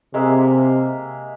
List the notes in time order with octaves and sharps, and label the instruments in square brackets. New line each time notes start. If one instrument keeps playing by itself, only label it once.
[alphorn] C3 [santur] G#3 A#3 E5